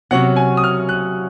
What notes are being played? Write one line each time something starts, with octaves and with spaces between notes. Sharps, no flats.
C3 F#3 C#4 F#5
G#5
D#6
F6
F#6